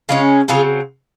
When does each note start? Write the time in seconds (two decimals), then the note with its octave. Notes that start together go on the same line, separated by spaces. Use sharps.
0.09 C#3 G#3 C#4 F4
0.48 C#3 F#3 C4 F4 G#4